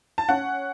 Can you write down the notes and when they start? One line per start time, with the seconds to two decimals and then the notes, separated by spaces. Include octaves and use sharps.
0.18 A5
0.29 C#4 F#5